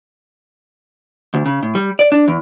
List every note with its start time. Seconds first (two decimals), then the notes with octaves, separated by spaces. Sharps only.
1.34 D2
1.46 C#3
1.63 A2
1.75 G3
1.99 D5
2.12 D4
2.28 E2